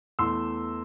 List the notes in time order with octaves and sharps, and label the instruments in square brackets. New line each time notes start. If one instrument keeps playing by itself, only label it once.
[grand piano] E2 E3 A3 C6 E6